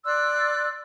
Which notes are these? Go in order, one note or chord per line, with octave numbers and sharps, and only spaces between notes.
D5 C6 E6 F#6